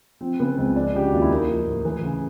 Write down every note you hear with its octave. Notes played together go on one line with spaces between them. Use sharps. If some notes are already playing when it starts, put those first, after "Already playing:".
F3 C4
C#3 B3
C#2 C4
F3 D4
C#3 G4
F#4
D#2 F4
E4
A#3 D#4
F3
A2
E3
C#3